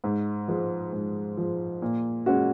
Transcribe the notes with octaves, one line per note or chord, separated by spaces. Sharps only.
G#2
F3 G#3
G#2
F3 G#3
A#2
G#3 C#4 F#4